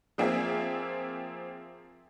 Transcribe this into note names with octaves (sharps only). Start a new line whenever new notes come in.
F3 A#3 C4 F4 G#4 E5